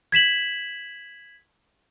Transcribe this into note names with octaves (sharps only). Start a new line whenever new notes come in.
G#6 B6 E7 F#7